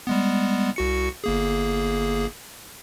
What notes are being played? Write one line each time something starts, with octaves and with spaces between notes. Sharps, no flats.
G3 G#3 B3
C2 F#4 C#7
G1 A#3 G#4